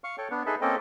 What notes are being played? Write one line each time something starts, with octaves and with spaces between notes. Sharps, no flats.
F5 C#6
A4 C#5 G5
B3 D4
D#4 G#4 A4 B4 E5
A#3 C4 C#4 A4 D#5 G5